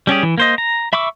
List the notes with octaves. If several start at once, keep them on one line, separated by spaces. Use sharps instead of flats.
G3 C#4 G4 G#4
E3
A#3 C5 D#5
A#5
E5 B5 C#6 D6 E6